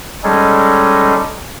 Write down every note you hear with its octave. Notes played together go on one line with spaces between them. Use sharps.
G3 G#3 C#4 D#4 G#4 A4